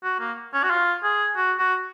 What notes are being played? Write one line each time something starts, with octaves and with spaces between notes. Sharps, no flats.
F#4
A#3
C#4
F#4
F4
G#4
F#4
F#4